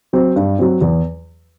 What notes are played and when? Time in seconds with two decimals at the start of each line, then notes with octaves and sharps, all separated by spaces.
0.13 F#3 C4
0.36 G2
0.59 F#3 C4
0.81 E2